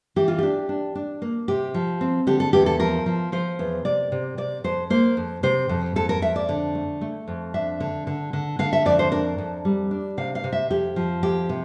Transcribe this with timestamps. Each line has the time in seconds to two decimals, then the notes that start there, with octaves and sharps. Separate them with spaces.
0.16 E3 G4
0.28 F4
0.38 D4 G4
0.69 D4
0.95 D4
1.22 A#3
1.48 C3 G4
1.74 F3
2.01 C4
2.27 D3 G4
2.40 A4
2.53 E2 G4
2.66 A4
2.80 F3 A#4
3.06 F3
3.32 F3 C5
3.59 E2
3.85 C3 D5
4.12 C3
4.38 C3 D5
4.64 F2 C5
4.90 A#3 C5
5.17 F2
5.43 C3 C5
5.69 F2
5.96 F2 A4
6.09 A#4
6.22 F2 E5
6.36 D5
6.49 D3
6.75 A3
7.01 A3
7.28 F2
7.54 D4 E5
7.80 D3
8.07 D3
8.33 D3
8.59 D3 F5
8.73 E5
8.85 F2 D5
8.99 C5
9.12 D4 A#4
9.38 F2
9.65 G3
9.91 D4
10.17 C3 F5
10.35 F5
10.44 C3
10.52 E5
10.70 F2 G4
10.96 F3
11.23 F2 G4
11.49 C3